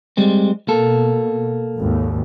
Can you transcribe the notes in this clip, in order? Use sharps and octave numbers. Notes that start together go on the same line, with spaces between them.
G3 G#3 C4
B2 A#3 A4
G#1 D#2